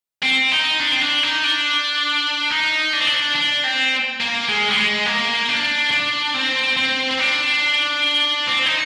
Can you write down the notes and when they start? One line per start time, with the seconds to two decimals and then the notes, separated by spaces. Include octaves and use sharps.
0.23 C4
0.52 D#4
0.80 D4
0.92 C4
1.01 D4
1.23 D#4
1.44 D4
2.50 D#4
2.93 D4
3.00 C4
3.07 D4
3.36 D4
3.64 C4
4.21 A#3
4.49 G#3
4.71 G3
4.78 G#3
5.06 A#3
5.49 D4
5.91 D4
6.34 C4
6.77 C4
7.11 C4
7.19 D4
8.47 C4
8.66 D#4